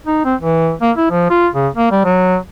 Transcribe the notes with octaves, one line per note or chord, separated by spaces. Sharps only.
D#4
C4
E3
A#3
E4
F3
F4
C#3
A#3
G3
F#3